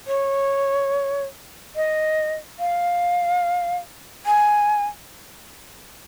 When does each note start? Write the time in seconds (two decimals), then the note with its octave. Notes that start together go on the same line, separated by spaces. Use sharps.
0.07 C#5
1.76 D#5
2.59 F5
4.26 G#5